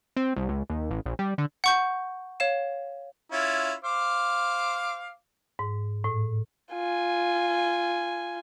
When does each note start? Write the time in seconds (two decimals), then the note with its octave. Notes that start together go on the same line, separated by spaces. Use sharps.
0.17 C4
0.36 C2
0.49 C#2
0.70 D#2
0.90 A1
1.06 A#1
1.19 G3
1.38 D3
1.64 F#5 C#6 G6
2.40 C#5 F5 E7
3.32 C#4 E4 F4
3.84 C5 F5 D6
5.59 G#2
6.04 A2
6.73 F4 G#5